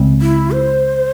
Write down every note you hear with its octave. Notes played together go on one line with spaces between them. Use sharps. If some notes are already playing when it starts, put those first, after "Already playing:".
Already playing: C#2 C#3 G#3 C4
E4
C5